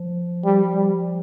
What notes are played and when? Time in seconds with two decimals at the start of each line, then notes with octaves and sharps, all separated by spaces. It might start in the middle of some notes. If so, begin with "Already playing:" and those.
Already playing: F3
0.44 G3
0.74 G3